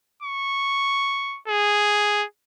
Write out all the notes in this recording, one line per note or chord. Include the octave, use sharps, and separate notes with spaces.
C#6
G#4